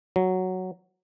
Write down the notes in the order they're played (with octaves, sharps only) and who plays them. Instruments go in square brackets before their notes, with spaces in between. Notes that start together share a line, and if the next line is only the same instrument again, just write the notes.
[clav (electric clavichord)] F#3